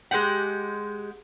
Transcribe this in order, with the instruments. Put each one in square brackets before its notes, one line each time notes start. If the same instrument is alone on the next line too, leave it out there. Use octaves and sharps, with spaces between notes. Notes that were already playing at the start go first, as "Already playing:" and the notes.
[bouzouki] G#3 B3 G4 F#5